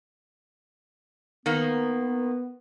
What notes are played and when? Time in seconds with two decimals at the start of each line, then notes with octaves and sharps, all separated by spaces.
1.46 D#3 A#3 B3